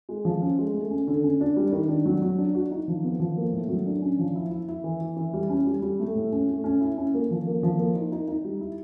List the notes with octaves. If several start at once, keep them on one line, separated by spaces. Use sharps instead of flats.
G#3
F3
C#4
G#3
A3
C#4
D3
C#4
D4
G3
D#3
D4
F#3
F#3
D4
F#4
D#4
F3
B3
F3
A#3
A2
F#3
D4
C#4
F3
E4
E4
E4
E3
E4
E3
G3
C#4
G3
G3
A3
A2
C#4
A3
C#4
E4
C#4
A#3
F3
A#3
F3
A#3
D#4
D#4
D#4
G3
E4